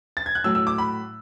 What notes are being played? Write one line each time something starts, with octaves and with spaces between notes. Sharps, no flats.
A6
G#6
F#6
A2 F#3 A3 E6
E6
D6
B5